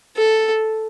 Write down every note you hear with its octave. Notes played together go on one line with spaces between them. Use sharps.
A4